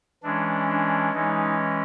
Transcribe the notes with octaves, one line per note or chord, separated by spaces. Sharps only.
E3 G#3 C#4 D4
D4
E3 G#3 C#4 D#4